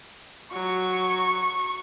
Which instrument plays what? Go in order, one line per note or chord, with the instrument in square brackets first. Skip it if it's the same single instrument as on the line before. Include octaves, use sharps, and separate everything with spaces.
[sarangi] F#3 [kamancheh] C#6